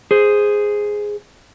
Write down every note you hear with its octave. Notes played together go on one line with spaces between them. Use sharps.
G#4 C5